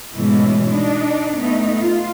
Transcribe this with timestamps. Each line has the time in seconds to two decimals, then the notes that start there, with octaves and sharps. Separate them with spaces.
0.14 G#2 B2 E3 G#3 A3 C#4
0.70 D4 D#4
1.38 A3 B3 D#4
1.79 F4